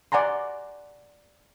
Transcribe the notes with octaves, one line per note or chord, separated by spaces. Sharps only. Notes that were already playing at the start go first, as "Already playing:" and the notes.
D5 F#5 G#5 A#5 C6